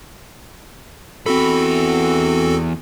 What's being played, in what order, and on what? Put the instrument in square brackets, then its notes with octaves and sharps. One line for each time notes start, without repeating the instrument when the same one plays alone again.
[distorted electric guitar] E2 B5 [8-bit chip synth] C4 F#4 A4